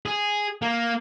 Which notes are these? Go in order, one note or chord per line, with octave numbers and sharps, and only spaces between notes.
G#4
A#3